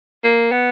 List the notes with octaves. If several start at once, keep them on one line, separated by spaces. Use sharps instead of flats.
A#3
B3